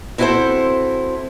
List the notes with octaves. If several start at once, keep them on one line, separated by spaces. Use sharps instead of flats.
C4 E4 F#4 G4 A4 C5